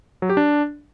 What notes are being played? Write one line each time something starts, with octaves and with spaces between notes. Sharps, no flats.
F#3
G4
D4